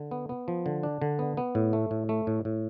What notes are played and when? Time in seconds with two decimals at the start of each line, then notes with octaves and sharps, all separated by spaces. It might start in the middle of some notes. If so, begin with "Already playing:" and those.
Already playing: D3
0.11 B3
0.29 B3
0.48 F3
0.66 D3
0.83 D4
1.02 D3
1.19 B3
1.37 B3
1.55 A2
1.73 A3
1.91 A2
2.09 A3
2.27 A2
2.45 A2